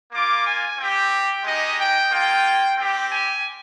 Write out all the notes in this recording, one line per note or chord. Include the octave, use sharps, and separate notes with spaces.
A#3 F4 D6
G#5
C4 G4 G5
G#3 D#4 G4 D#5
G5
A#3 F4 G5
C4 G4 G5
G#5